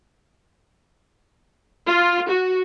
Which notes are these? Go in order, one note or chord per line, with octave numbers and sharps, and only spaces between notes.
F4
F#4